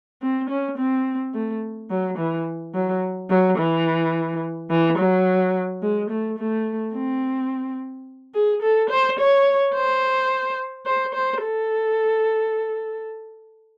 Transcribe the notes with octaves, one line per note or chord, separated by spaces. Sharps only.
C4
C#4
C4
A3
F#3
E3
F#3
F#3
E3
E3
F#3
G#3
A3
A3
C4
G#4
A4
C5
C#5
C5
C5
C5
A4